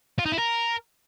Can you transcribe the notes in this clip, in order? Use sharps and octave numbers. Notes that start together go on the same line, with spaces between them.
F4
D#4
E4
A#4